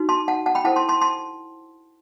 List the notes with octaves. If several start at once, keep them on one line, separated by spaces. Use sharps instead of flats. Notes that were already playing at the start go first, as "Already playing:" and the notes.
Already playing: D#4 F#4 B4
A5 C6
F#5 A5
F#5 A5
G5 B5
E4 A4 C5 F#5 A5
A5 C6
A5 C6
A5 C6